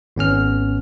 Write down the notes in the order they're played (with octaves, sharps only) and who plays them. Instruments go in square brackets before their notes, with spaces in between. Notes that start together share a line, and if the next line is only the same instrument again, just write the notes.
[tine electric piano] G#1 B3 C#4 F6